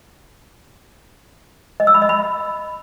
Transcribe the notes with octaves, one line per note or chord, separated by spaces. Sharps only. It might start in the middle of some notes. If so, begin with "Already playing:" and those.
D#5
E6
B5
D#5
B5